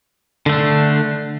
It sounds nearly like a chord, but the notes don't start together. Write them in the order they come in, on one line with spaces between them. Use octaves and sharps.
D3 A3 D4